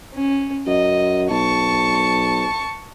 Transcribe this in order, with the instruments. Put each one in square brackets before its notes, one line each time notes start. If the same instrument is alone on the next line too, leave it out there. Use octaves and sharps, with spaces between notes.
[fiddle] C#4
[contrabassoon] F#2 [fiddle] D#5
[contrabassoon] B1 [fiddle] A5 C#6